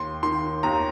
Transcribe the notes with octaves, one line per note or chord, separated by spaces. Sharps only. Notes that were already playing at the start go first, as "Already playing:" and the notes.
Already playing: D#2 C6
D#3 C6
D#2 A#5